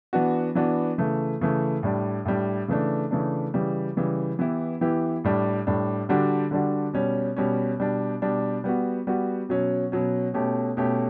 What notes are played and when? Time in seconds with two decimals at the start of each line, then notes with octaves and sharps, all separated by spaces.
0.13 E3 B3 D4 F#4
0.55 E3 B3 D4 F#4
0.98 C#3 E3 A3
1.41 C#3 E3 A3
1.83 A2 G3 D4
2.25 A2 G3 D4
2.68 C#3 E3 A3 D4
3.11 C#3 E3 A3 D4
3.54 C#3 E3 G3
3.97 C#3 E3 G3
4.39 E3 B3 E4 G4
4.81 E3 B3 E4 G4
5.24 A2 G3 D4
5.67 A2 G3 D4
6.09 D3 G3 D4 F#4
6.51 D3 G3 D4 F#4
6.93 B2 G3 C#4
7.36 B2 G3 C#4
7.79 B2 G3 D4
8.22 B2 G3 D4
8.64 G3 B3 F#4
9.07 G3 B3 F#4
9.49 B2 F#3 C#4
9.92 B2 F#3 C#4
10.34 B2 A3 C#4 G4
10.77 B2 A3 C#4 G4